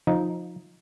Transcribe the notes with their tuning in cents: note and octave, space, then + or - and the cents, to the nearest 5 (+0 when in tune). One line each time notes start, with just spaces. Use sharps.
F3 +20 D#4 +0